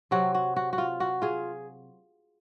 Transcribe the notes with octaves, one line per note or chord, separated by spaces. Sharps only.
C3 F#3 C4 F#4
F#4
F#4
F#4
F4
F#4
F4 G#4